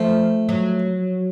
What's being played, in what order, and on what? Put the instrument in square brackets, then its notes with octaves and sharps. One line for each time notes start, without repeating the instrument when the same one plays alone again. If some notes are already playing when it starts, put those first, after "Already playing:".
Already playing: [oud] F3 [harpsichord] A3
[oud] F#3